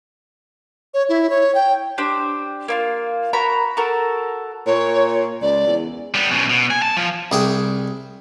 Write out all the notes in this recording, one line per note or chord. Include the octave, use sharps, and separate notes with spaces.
C#5
E4
C#5
G5
D4 G4 C5
A#3 E4 F4
F#4 A#4 A#5 B5
F#4 A4 A#4
A#2 C#5
C#2 D5
E2
G3 B3
F#2 B2
B2
G#5
A5
F3
C2 G#4 G5